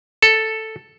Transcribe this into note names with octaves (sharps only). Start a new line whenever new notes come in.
A4